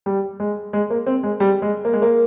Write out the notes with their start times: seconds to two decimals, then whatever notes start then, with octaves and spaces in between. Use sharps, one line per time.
0.06 G3
0.40 G#3
0.73 G#3
0.90 A#3
1.06 C4
1.23 G#3
1.40 G3
1.62 G#3
1.85 A#3
1.93 G#3
2.02 A#3